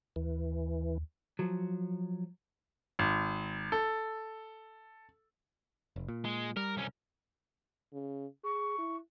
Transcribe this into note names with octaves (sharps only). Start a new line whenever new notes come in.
D#2 E3
F3 F#3
G#1
A4
F1
A#2
G#3
G3 A#4
C2 C#4
C#3
G#4 C#6
E4